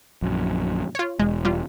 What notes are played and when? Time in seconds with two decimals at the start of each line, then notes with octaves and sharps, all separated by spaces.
0.22 A#1 F#2
0.95 F4 C#5
1.19 E1 G#3
1.45 G3 F4